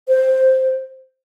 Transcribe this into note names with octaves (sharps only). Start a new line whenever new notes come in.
C5